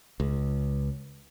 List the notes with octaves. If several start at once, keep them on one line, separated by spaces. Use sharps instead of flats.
C#2